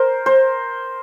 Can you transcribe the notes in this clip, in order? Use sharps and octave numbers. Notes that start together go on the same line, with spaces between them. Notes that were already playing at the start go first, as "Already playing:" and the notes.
Already playing: A#4 C5
C5